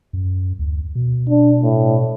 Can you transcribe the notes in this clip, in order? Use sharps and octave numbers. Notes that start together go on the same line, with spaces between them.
F#2
D2
B2
D4
A2